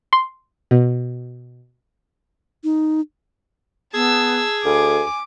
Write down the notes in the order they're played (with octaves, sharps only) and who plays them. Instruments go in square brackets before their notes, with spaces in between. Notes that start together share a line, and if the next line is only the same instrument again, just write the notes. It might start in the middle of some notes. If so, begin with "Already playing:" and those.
[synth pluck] C6
B2
[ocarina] D#4
[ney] B3 [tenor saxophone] G#4 [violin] A5 E6
[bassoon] D2 [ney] G#5 [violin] D6